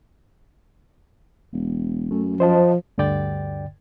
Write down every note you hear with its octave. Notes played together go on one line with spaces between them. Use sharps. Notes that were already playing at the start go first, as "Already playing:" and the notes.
E1
F#2 A3
F3 C5 D#5 A5
D2 G2 D3 D5 G5 A6